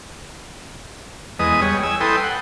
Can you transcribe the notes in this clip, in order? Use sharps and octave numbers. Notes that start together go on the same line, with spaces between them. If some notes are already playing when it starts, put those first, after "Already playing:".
E2 G#3 B4 D#5 D#6
G3 G#4 C#5
G#5 E6
E4 A4 B4 G5 C6 D#6
F#5